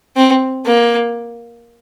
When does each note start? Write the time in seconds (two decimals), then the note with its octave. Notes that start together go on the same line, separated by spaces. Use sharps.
0.16 C4
0.66 A#3